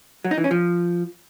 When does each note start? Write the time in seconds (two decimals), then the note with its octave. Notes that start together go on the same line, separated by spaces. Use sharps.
0.24 F#3
0.31 D#4
0.38 E3
0.44 C#4
0.51 F3